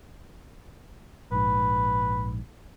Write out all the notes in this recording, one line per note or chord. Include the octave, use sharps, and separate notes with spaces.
A#1 G#2 B4